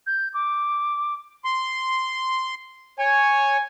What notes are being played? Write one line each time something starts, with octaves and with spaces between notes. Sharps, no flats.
G6
D6
C6
C#5 G#5